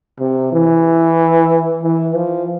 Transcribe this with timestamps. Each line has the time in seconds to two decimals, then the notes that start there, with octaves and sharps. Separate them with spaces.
0.19 C3
0.52 E3
1.83 E3
2.15 F3